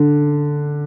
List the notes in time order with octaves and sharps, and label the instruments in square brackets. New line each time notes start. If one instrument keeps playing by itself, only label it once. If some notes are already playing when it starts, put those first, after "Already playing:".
Already playing: [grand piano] D3